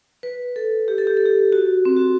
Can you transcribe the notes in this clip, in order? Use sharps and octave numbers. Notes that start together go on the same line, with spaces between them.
B4
A4
G4
A4
G4
A4
G4
F#4
C4
F#4